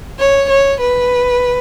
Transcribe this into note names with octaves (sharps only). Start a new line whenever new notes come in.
C#5
C#5
B4